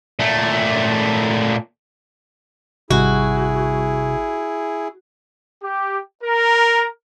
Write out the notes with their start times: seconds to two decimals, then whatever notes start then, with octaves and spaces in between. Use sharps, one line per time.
0.20 A#2 A3
2.90 G#1 C3 G3 E4 F#4 G#4
5.62 G4
6.23 A#4